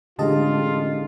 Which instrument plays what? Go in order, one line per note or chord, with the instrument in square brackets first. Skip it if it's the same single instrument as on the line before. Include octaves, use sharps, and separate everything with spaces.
[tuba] A1 [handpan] D3 G#3 [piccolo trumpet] F4 [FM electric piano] G4 D#5 A5